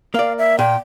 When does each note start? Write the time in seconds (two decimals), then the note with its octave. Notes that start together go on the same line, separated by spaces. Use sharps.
0.14 A#3 D5 F5
0.38 E5
0.59 A#2 G5